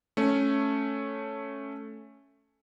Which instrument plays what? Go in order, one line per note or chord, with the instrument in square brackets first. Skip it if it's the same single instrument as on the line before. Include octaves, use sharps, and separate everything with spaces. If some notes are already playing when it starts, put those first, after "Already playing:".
[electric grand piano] A3 C#4